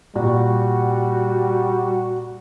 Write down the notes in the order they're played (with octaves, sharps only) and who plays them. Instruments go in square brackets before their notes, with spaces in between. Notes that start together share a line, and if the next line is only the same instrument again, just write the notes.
[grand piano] A#2 [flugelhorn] G3 [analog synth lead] F#4